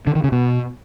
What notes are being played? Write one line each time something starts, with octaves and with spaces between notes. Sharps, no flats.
D3
D#3
C#3
B2